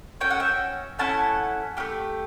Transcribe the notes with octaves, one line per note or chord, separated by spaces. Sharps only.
C#4 F#4 A4 G5
F#5
E5 G5
A3 C#4 E4 F#5 A5
A3 C#4 G4